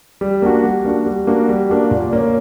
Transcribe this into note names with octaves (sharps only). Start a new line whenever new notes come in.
G3
A#3 D4 F#4
G3
A#3 D4 F#4
G3
A#3 D4 F#4
G3
A#3 D4 F#4
A#2
A#3 C#4